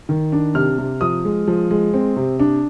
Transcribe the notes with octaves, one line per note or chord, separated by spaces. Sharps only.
D#3
D4
C3 F6
C3
F3 D#6
G#3
F3
G#3
C4
C3
D4